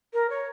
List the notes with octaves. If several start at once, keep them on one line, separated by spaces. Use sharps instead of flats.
A#4
C#5